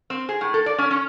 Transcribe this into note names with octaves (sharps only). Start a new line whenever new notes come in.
C4
G#4
A2
A4
D5
C#4
C#4